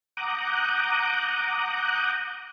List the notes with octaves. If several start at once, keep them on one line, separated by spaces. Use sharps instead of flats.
F#5 A#5 D6 D#6 F#6 G6